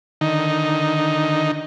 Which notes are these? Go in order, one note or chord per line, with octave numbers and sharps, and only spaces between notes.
D3 D#3 D#4